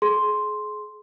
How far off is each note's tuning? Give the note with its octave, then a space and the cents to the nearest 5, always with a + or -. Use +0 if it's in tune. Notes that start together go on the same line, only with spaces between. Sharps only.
G#4 +35 C6 +0